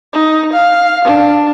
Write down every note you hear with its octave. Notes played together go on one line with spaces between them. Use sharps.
D#4
F5
D4